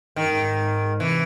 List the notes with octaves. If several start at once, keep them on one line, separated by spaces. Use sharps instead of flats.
G#2 D#3
F#2
G#2
C3 E3